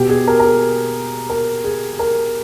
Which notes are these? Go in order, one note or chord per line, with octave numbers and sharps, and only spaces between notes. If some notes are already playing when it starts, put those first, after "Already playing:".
Already playing: B2 G4
G#4
A#4
A#4
G#4
A#4
G#4
A#4